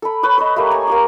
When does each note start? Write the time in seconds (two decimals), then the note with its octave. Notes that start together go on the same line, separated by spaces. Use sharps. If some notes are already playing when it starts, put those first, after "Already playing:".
0.02 A4 B5
0.23 B4 C#5 D#6
0.38 B4 D#5
0.56 A3 A#3 G4
0.71 C#5 G#5 A#5
0.87 A#3 G4 D6